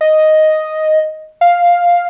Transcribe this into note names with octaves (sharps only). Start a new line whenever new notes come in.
D#5
F5